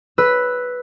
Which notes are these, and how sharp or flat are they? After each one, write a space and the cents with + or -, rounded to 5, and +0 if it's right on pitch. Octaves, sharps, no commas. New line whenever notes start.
B4 +0 E6 +0